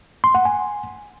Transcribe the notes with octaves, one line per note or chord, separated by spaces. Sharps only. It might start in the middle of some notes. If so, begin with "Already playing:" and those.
C6
F#5
G#5